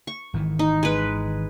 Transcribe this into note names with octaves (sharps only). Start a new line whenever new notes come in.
C#6
G#1 D#3 E3
D#4
G#3 B4